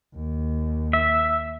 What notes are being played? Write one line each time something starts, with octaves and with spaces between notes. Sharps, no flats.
D#2
E5